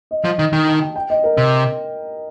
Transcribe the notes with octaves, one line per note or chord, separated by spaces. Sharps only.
D#5
F3
D#3
D#3 G5
A5
G5
G5
D#5
A#4
C3